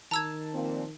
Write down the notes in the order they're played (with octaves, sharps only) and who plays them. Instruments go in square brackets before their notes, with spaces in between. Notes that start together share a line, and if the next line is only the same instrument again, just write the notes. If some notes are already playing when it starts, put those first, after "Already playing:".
[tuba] D#3 [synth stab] A5 [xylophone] A#5 E6 G#6
[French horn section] A#2 F3 C4